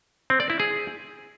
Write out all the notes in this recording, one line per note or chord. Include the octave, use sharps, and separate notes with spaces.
C4
D5
E4
G#4